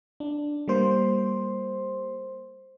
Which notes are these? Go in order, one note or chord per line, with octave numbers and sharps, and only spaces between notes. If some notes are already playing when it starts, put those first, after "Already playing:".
D4
G3 A#3 C5 C6